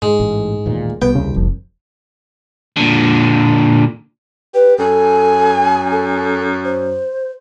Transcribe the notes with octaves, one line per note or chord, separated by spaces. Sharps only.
G#2 G#3
A1
A1 D#2 A#2
C2 B3 G5
D#2 C#3
F1 F3
A#2 D3
G4 B4
F#2 A4 G#5
A4
C5